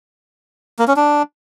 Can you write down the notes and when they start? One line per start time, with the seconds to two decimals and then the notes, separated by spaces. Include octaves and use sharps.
0.79 A#3
0.88 C#4
0.96 D4